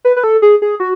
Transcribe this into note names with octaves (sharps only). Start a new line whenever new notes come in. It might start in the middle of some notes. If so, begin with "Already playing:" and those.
B4
B4
A4
G#4
G#4
F#4